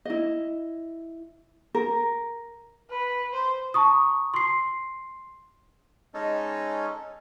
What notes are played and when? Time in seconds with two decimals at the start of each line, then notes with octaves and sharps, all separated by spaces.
0.05 E4 D#5
1.75 A#4
2.90 B4
3.33 C5
3.74 A5 A#5 C#6 D#6
4.34 C6 C7
6.14 G#3 C#4 D#4 A4